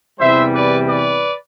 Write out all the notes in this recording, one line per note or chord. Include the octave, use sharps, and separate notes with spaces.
E2 C3 E3 G3 C5 E5
B4 D5
B4 D5